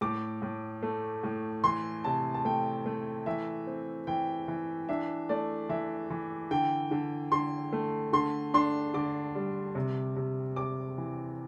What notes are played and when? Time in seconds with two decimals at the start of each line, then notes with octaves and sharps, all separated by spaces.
0.01 A2 D6
0.42 A2
0.83 A3
1.23 A2
1.64 E3 C6
2.04 C3 A5
2.34 A5
2.45 A3 G5
2.86 A3
3.26 E3 E5
3.67 C4
4.07 E3 G5
4.48 E3
4.89 D4 E5
5.29 A3 D5
5.69 E3 E5
6.10 E3
6.51 D3 G5
6.91 D3
7.32 D3 C6
7.73 A3
8.13 D3 C6
8.54 D4 C6
8.94 D3 D6
9.35 G3
9.75 C3
10.16 C3
10.56 C3 D6
10.98 E3